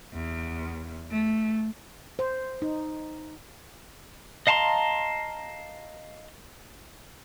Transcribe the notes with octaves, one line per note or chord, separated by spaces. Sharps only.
E2
A3
C5
D#4
D#5 F5 A5 A#5 C6